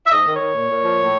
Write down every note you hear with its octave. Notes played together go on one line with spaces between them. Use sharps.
E5
G#2 D#5
D#3
C#5
D#3
A#2
A#2
F3
A2